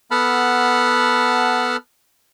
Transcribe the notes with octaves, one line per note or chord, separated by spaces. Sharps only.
B3 A4 F#5 A5 B5 F6